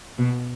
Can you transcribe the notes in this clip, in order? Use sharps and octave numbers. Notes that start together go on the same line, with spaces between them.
B2